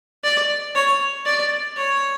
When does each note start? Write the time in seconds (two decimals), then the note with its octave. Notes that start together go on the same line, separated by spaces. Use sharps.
0.24 D5
0.75 C#5
1.26 D5
1.77 C#5